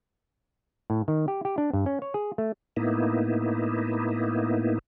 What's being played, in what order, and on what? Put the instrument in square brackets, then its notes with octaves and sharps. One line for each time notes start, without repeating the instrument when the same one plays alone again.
[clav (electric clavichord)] A2
D#3
G4
G4
D4
G2
C#4
C#5
G#4
A3
[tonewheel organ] A2 A#3 B3 D#4 E4